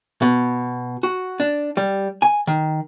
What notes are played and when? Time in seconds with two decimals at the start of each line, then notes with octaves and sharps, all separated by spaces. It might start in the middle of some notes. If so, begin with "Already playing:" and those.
0.22 B2
1.03 F#4
1.40 D4
1.77 G3
2.22 G#5
2.47 D#3